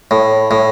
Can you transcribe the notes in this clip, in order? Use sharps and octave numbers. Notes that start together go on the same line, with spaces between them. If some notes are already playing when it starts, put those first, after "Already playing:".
A2
A2